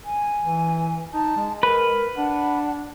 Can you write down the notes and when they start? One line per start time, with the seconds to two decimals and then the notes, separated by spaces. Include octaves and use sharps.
0.05 G#5
0.43 E3
1.13 D#4 A5
1.37 G#3
1.63 A#4 B4
2.17 D4 F#5